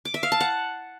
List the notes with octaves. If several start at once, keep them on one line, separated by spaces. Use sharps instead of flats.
D6
E5
F5
A5
F#5